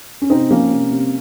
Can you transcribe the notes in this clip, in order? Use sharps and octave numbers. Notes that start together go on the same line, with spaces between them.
C#4
C3 C4 D#4
F3 A#3 C#4
C3
C3